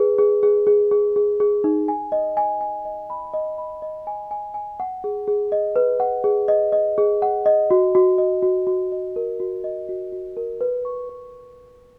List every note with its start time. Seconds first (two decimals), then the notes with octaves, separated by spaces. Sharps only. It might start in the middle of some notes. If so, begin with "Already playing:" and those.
Already playing: G#4 B4
0.18 G#4
0.43 G#4
0.67 G#4
0.91 G#4
1.16 G#4
1.40 G#4
1.64 D#4
1.88 G#5
2.12 D#5
2.37 G#5
2.61 G#5
2.85 D#5
3.10 B5
3.34 D#5
3.58 B5
3.82 D#5
4.07 G#5
4.31 G#5
4.54 G#5
4.80 F#5
5.04 G#4
5.28 G#4
5.52 D#5
5.76 B4
6.00 F#5
6.24 G#4
6.48 D#5
6.72 D#5
6.98 G#4
7.22 F#5
7.46 D#5
7.71 F#4
7.95 F#4
8.18 D#5
8.43 F#4
8.67 F#4
8.92 D#5
9.16 A#4
9.40 F#4
9.64 D#5
9.89 F#4
10.12 F#4
10.37 A#4
10.61 B4
10.85 C#6
11.09 B4